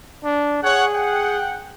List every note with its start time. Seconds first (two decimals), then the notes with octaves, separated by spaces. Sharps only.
0.24 D4
0.63 G#4 C#5 F#5
0.94 F#5 G5